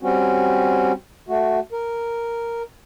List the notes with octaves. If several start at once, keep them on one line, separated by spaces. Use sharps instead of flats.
G3 C4 C#4 F#4
A3 F#4
A#4